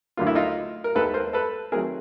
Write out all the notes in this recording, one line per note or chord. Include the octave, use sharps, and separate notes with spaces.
D2 D3 F#3 A#3 F4
E4
D#4 F4
A#4
D#2 D#3 G#3 B3 A4 B4
A#4 C5
A4 B4
D#3 F#3 A3 C4 G#4 A#4